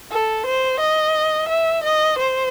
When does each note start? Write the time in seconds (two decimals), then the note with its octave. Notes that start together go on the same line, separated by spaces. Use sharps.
0.11 A4
0.46 C5
0.80 D#5
1.49 E5
1.84 D#5
2.18 C5